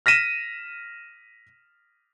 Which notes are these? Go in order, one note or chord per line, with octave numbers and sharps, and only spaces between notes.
F6 A#6 B6 D#7 E7